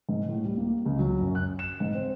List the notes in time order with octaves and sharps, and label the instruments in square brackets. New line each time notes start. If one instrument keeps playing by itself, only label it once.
[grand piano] G#2
A2
G3
A#3
C#2
F#3
F#2
F#6
E7
G#2
C4